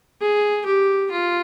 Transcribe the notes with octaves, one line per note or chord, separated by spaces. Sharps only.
G#4
G4
F4